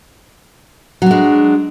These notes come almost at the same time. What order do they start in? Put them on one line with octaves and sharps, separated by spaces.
F#3 D4 G#3